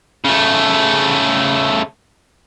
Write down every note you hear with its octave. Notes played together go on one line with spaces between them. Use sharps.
C#3 A3